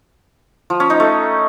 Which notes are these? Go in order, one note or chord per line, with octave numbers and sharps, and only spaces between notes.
F3
C#4
D#4
A3